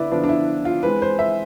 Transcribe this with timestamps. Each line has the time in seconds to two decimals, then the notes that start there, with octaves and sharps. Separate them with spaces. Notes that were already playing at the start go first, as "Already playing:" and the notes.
Already playing: D3 B3 E4 B4 D5
0.11 D3 F3 B3 D4
0.24 D4
0.29 E4
0.65 F4
0.83 E3 G#3 C4 B4
1.02 C5
1.19 E5